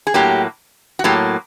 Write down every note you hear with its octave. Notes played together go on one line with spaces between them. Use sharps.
G#4
A2 F#3 A#3 G4
F#4
A2 F#3 A#3 G4